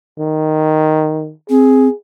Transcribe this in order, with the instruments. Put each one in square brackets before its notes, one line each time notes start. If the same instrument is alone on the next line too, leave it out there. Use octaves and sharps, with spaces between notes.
[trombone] D#3
[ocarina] C4 [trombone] G#4